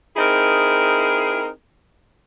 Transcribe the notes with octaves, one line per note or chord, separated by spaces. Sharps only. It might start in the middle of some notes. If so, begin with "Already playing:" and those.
C4 D#4 E4 G#4 A#4